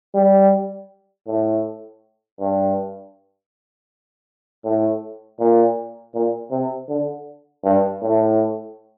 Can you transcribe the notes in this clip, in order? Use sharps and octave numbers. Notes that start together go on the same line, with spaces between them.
G3
A2
G2
A2
A#2
A#2
C3
D3
G2
A2